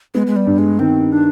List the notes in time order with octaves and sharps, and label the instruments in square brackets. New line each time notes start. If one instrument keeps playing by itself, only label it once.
[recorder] G#3 [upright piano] B3
[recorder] G#3
G3
[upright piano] G2
[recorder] G#3
[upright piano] D#3 [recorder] C4
[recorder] D4